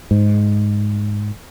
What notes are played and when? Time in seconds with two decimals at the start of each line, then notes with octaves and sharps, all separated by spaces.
0.11 G#2